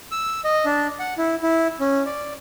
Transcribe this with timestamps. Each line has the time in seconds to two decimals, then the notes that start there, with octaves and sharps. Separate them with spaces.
0.11 E6
0.44 D#5
0.65 D4
0.99 F#5
1.18 E4
1.43 E4
1.80 C#4
2.06 D5